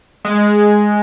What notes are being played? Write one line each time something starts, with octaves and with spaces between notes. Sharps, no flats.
G#3